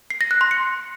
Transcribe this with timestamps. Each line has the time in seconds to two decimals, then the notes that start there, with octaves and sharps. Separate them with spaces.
0.10 C7
0.21 A#6
0.31 F#6
0.41 C6
0.51 C#7